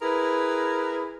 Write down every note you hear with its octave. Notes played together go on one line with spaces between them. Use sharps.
E4 G#4 A#4 B4